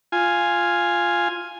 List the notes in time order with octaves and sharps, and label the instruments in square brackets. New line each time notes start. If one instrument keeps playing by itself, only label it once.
[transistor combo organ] F4 G#5